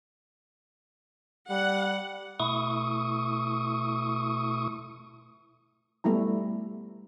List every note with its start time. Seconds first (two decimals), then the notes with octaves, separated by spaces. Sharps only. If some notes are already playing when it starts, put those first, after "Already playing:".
1.50 G3 F#5
2.40 B2 A3 E4 C#6 D#6
6.04 G3 A3 B3 E4 A#5